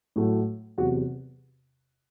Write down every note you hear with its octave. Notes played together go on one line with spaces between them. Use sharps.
A2 F#3 A3
E2 C3 F#3 F#4 F#5